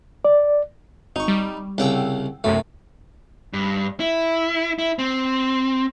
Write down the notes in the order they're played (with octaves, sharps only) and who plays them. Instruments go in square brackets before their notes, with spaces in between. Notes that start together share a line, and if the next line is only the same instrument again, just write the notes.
[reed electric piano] D5
[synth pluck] G#1 C#6 [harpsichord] D#4
[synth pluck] G3
[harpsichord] C2 C#3 [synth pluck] F#5 G5 E6
[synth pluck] B1 F#2 C3 [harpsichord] A3
[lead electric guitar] G2
E4
E4
C4